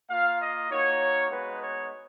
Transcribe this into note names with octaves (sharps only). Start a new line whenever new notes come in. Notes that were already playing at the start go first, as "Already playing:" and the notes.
A#3 F4 F5
D#5
A#3 D#4 F#4 C#5
G#3 B3 D#4 F#4 B4
C#5